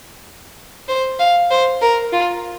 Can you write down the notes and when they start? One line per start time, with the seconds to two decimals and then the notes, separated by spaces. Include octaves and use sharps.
0.89 C5
1.20 F5
1.50 C5
1.82 A#4
2.13 F4